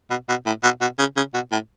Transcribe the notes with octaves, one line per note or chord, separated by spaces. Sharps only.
B2
B2
A2
B2
B2
C#3
C#3
B2
A2